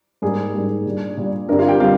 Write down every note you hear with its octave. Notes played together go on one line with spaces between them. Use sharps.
G#2 G3 A#3 G#4
G#2 G3 A#3
A#2 G3 D4
A#2 G3 D4
G2 D3 G3 C4 A#4
F4 F5
G4 G5
D3 G3 C4 F4 F5